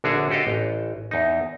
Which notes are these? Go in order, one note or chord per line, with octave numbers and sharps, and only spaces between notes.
A#1 D3 D4 F#4 G#4 C#5
F#4 G4 A4 D#5 F5
A1
E2 D#4